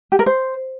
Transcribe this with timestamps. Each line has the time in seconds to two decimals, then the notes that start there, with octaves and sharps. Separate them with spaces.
0.12 G4
0.19 A#4
0.26 C5